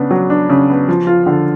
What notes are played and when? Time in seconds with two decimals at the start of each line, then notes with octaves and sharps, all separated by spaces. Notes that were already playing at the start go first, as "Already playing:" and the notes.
Already playing: C#3 B3 D4
0.11 F#3
0.30 D4
0.50 C#3
0.69 B3
0.88 F3
1.07 F4
1.26 D3